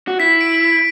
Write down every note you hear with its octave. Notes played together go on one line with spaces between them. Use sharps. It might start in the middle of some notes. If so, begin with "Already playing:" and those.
F#4
E4 B6
D7